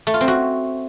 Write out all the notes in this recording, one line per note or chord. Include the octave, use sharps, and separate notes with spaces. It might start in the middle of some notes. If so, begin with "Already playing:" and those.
A3
F4
C4
F#4